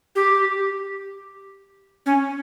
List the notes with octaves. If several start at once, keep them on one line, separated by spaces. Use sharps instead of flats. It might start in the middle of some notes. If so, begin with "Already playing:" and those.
G4
C#4